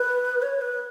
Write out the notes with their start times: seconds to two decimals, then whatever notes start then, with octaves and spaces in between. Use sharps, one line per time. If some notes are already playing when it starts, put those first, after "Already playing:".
Already playing: B4
0.42 C#5
0.61 B4